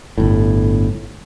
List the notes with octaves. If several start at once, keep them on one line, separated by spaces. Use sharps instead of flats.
G1 A2